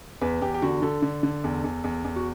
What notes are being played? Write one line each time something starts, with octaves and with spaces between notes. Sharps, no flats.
E2 B4
E2 G4
G4
D3 F#4
D3 A4
D3
D3
E2
E2
E2
E2
F#4